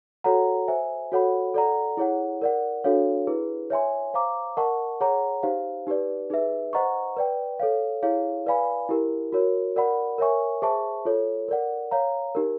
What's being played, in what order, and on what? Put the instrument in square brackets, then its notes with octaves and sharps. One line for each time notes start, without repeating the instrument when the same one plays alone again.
[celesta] F#4 A4 C#5 F#5 A#5
C5 E5 G#5
F#4 A4 C#5 F#5 B5
A4 D5 F#5 A#5
E4 G#4 C#5 F#5
A#4 D5 F#5
D4 F#4 A4 C#5 F5
E4 G#4 B4
C#5 E5 G#5 C6
C5 F5 A#5 D6
A#4 D#5 F#5 A5 C#6
G#4 C#5 F#5 A#5
D#4 G4 C5 F5
D#4 G4 B4 D5
D#4 G#4 B4 E5
C5 D#5 F#5 A#5 C#6
B4 D5 G5
A4 C#5 F5
E4 G#4 C#5 F5
B4 D5 F5 G#5 B5
E4 G4 A#4
F#4 A#4 C#5
A#4 D5 F#5 B5
A#4 C#5 E5 G#5 C#6
G#4 C5 E5 A5 C#6
F4 A4 C#5
A#4 D5 F#5
C#5 F5 A#5
D#4 G4 A#4